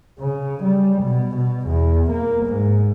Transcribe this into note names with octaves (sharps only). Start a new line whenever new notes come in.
C#3
G3
B2
B2
E2
A#3
G#2